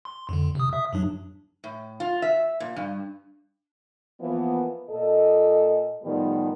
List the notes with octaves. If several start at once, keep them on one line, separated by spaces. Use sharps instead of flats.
C6
F2 D3
C3 D#6
E5 D#6
F#2 F#3 D4
A2
F4
E5
A#2
G2
E3 F3 A#3 B3
A#2 A4 D#5
A2 D#3 F3 G3 B3